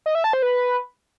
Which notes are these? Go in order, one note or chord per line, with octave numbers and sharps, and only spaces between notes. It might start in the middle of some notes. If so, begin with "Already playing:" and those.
D#5
E5
A5
C5
B4